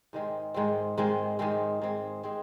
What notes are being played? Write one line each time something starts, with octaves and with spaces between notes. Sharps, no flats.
G#2 D#3 G#3 C4
G#2 D#3 G#3 C4
G#2 D#3 G#3 C4
G#2 D#3 G#3 C4
G#2 G#3 C4 G#4
G#3 C4 G#4